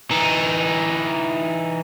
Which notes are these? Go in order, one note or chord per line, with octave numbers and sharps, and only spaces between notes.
E3 D#4